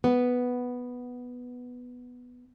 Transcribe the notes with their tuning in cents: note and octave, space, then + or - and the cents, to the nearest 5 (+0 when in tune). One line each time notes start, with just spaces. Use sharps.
B3 +0 B4 +0